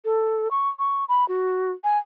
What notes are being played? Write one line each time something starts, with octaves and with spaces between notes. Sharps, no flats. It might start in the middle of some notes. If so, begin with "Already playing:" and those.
A4
C#6
C#6
B5
F#4
G#5